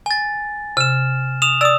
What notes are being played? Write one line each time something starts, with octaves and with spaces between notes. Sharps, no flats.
G#5 A6
C3 F6 E7
D#6 E7 F7
D5 D#6 E6 A6